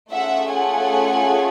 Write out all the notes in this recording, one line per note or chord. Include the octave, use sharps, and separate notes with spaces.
A3 C#4 F4 G#4 E5 F#5
F#5 G#5